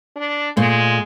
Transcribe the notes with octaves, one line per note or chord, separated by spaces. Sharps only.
D4
A#2 G#3 A3